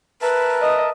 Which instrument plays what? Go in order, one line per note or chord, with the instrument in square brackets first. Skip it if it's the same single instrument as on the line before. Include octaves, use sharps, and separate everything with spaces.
[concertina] A#4 E5 A5 [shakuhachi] B4
[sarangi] D#5